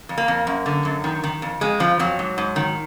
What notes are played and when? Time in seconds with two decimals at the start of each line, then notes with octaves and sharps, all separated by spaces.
0.09 F2
0.18 A#3
0.28 F2
0.47 F#2
0.66 D3
0.85 F#2
1.04 D#3
1.24 D#3
1.42 F2
1.61 F2 G#3
1.80 F2 F3
1.99 F2 F#3
2.19 G#2
2.38 G#2
2.56 D#3